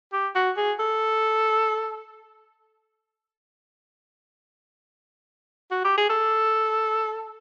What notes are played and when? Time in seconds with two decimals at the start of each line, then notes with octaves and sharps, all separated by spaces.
0.13 G4
0.35 F#4
0.57 G#4
0.79 A4
5.71 F#4
5.84 G4
5.97 G#4
6.10 A4